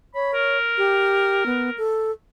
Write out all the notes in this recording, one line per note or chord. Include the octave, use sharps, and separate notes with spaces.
C#5 B5
A#4
G4
B3
A4